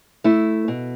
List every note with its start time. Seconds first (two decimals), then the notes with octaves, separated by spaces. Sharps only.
0.24 A3 E4
0.68 B2